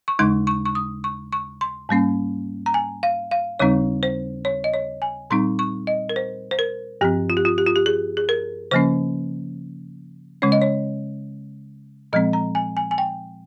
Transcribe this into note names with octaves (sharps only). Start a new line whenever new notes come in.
C#6
D#2 C#3 G#3 D#4 C6
C#6
C#6
D#6
C#6
C#6
C6
G#2 G3 A#3 C#4
A#5
G#5
F5
F5
D#2 C#3 G3 C4 D#4 C#5
C5
C#5
D#5
C#5
G#5
A#2 G3 C4 D#4 C6
C#6
D#5
A#4
C5
C5
A#4
G2 F3 C4 G4
F4
G4
F4
G4
F4
G4
G#4
G#4
A#4
C#3 F3 A#3 C#4 C5
C#3 G#3 C#4 C#5
D#5
C#5
A#2 F3 G#3 C4 D#5
A#5
G#5
G#5
G#5
G5